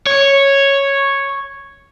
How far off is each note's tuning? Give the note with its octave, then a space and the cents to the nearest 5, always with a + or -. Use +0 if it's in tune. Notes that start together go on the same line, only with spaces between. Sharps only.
C#5 -5